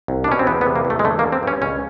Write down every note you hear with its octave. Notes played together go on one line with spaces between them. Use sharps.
C2
D4
B2 C#4
C4
E2 B3
B3
C3
A#3
E2
A3
G#3
D3 A3
A#3
D3
C4
G2 C#4
C#2 C#4